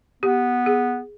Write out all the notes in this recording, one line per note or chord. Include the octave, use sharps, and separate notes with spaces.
B3 G4
G#4